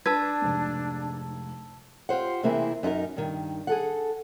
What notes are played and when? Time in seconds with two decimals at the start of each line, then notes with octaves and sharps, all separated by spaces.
0.06 D4 B4 A5 E6 G#6
0.42 F1 G#2
2.09 F4 G4 C5 F#5
2.43 C3 E3 A#3 C4 E4 G#4
2.83 F#2 D#4 E4 A#4
3.16 G2 D#3
3.67 G#4 A4 F#5